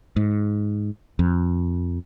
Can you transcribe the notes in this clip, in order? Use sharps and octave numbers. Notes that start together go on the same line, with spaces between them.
G#2
F2